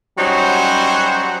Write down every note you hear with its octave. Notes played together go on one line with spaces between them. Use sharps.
F#3 G3 C#4 D#4 F#4 C5